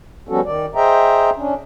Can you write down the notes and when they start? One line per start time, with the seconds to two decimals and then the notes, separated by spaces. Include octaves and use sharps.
0.29 F3 G3 B3 C#4 F#4 A4
0.45 D#3 D5
0.75 G#4 C5 D#5 E5 G5 A#5
1.37 C#4 D4